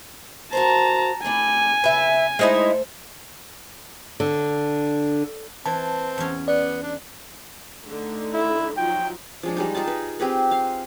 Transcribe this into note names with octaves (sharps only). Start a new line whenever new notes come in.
F#4 A#4 C5 A5 A#5
A3 D4 E4 G#5
C#3 B4 E5
G#3 A3 D#4 E4 C5 E5
D3
E3 C4 A5
E2 C#4
B3 D5
D4
D3 A3 D#4
E4
F3 F#3 D#4 G5
F3 G#3 D4
G3 G#3 D#4
D#4 F4 G#4 A5
B4
C4 G4 G#4 B4
F5